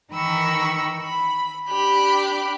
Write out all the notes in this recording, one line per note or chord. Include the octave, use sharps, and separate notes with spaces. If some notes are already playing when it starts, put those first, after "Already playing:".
D#3 E3 A#4 B5 C#6 E6
B5
D4 G4 B5